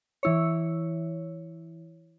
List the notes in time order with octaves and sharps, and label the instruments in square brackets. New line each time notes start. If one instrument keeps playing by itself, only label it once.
[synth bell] E3 E4 C#5